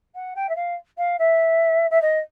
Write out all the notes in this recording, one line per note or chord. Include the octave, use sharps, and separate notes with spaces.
F#5
G5
E5
F5
F5
E5
E5
D#5